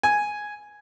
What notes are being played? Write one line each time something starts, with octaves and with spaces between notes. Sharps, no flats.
G#5